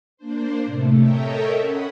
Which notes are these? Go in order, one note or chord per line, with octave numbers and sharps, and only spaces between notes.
A#3 D4 C5
A2 C3 A3
A4 A#4 C#5 D#5 E5 G5
C#4 F#5 B5 D#6